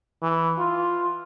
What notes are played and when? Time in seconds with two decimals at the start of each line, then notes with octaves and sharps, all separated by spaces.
0.22 E3
0.59 F4